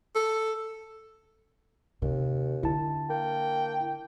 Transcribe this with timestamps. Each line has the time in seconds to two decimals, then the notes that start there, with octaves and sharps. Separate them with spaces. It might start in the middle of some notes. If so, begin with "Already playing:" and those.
0.15 A4
2.02 D#2 C3
2.63 D3 E4 A5
3.10 A#3 G5